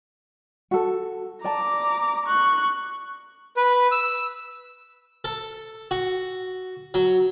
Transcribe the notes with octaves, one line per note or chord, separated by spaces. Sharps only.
F#4 A4
D5 A5 A#5 D6
C#6 F#6
B4
E6
A4
F#4
F#3